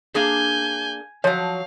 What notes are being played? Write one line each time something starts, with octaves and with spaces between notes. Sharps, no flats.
A#3 D4 G#4 G#5 G6
F3 F#3 C#5 F5